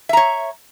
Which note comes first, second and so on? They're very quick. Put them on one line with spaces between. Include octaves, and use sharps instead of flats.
E5 A#5 C#5